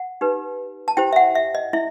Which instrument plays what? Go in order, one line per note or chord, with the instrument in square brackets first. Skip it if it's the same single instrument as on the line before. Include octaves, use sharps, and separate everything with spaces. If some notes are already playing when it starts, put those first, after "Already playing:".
Already playing: [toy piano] F#5
D#4 G4 B4
A5
E4 G4 C5 G5
E5
F#5
E5
D#5
E4 E5